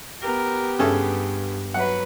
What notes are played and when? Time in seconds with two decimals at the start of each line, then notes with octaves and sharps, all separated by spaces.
0.22 B3 G4 A#4
0.79 G2 C#3 C#4 A4
1.74 F#3 B4 F#5